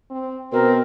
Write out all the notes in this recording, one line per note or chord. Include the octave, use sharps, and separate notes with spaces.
C4
B2 C4 A#4